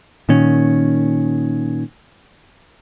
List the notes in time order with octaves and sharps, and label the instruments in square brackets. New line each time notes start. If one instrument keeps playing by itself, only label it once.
[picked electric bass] A#2 D#3 C#4